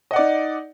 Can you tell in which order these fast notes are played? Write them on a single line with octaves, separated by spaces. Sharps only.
D#5 F#5 D5 D#4